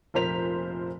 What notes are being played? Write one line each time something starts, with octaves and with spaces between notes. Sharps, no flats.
F1 A#2 A#4 C5 B6 F7